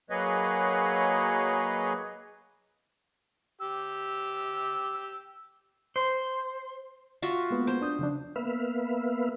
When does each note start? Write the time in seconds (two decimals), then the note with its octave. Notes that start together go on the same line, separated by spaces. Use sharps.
0.10 F#3 A#3 G#4 B4 C#5 D#5
3.61 G4 E6
5.96 C5
7.22 F4 F#4 E5
7.51 G#3 A#3 B3
7.67 C5
7.81 D4 D#6 G6
7.99 C#3 F3 D4
8.36 A#3 B3 B4 E5 F5